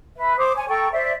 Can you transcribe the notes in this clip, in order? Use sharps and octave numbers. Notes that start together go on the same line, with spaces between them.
B4 E5
C5 D6 D#6
C#5 G#5
A4 G5 A#5 C#6
C5 D5 E5